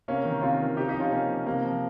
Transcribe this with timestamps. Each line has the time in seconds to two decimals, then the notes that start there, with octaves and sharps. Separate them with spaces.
0.08 C3 A#3 C#4
0.25 D#3
0.42 C3 C#4 F4
0.60 D#3
0.77 C3 D#4 G4
0.88 D#4 G4
0.94 F3
1.00 C#4 F4
1.12 C3 A#3 C#4
1.29 F3
1.46 C3 A#3
1.64 F3